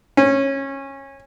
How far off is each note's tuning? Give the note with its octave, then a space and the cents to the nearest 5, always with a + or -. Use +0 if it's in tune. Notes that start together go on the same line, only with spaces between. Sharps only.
C#4 -20